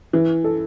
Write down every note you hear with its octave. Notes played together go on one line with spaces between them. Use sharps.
E3
A4